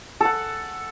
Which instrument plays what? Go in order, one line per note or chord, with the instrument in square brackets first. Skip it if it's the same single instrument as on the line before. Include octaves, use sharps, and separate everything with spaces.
[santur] A4 F#5